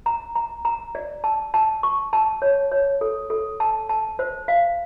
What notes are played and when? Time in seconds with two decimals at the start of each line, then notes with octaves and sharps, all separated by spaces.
0.06 A#5
0.35 A#5
0.65 A#5
0.95 D5
1.24 A5
1.54 A5
1.83 C#6
2.13 A5
2.42 C#5
2.71 C#5
3.01 A4
3.30 A4
3.60 A5
3.89 A5
4.19 C5
4.48 F5